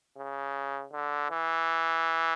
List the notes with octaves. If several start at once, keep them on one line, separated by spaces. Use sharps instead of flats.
C#3
D3
E3